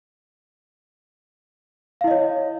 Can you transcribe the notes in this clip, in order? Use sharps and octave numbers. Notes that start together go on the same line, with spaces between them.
E4 C#5 D#5 F5